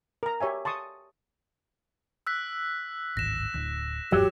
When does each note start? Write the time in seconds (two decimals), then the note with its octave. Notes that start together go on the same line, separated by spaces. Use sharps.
0.23 A#4 A#5
0.40 G4 C#5 E5 G#5
0.65 A5 C6 C#6 D#6
2.27 E6 F#6 B6
3.17 D1 G#1 A#6 E7
3.54 D1 D2 F#6
4.12 G1 E2 G#2 F#3 G4